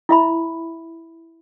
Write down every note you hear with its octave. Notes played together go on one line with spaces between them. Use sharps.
E4 E5 B5